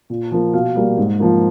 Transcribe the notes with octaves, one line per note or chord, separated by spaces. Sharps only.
A#2
F3 A#3
B2 F5
G3 A#3
G#2
F3 A#3